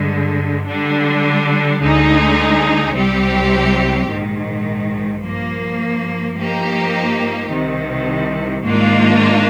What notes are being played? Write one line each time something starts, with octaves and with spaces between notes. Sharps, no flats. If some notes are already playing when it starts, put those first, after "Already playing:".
Already playing: G2 D3 G#3
D3 G3 D4
D2 D3 G#3 D#4 G#4
C2 C3 G3 C4 G4
A#1 G#2 D#3
G2 F3 A#3
G2 F3 A#3 D#4 G4
C2 C3 D#3
G#2 D#3 A#3 D4 F4